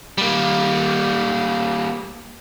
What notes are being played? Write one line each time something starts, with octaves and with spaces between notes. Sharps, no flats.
G3 A#3